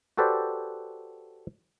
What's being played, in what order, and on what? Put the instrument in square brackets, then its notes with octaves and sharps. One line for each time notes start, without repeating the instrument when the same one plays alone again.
[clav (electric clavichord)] F#4 G4 A4 B4 C5 D5